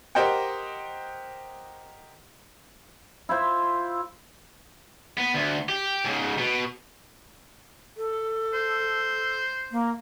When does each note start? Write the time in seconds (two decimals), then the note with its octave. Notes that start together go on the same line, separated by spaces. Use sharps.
0.15 G4 A#4 C5 D#5 F#5 G5
3.29 E4 F4 C5 E5
5.18 B3
5.35 D2
5.69 G4
6.05 G#2 C#3
6.38 B2
7.97 A4
8.53 C5
9.71 A#3